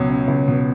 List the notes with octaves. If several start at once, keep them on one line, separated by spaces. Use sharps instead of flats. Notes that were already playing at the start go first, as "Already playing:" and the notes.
Already playing: C#2 B2 F#3
C#4
C#2
B2